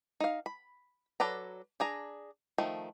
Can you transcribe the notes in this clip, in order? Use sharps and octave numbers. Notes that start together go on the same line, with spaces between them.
D#4 F5
B5
F#3 A4 B4 D5 A#5
D4 G#4 A#5
D#3 F3 A3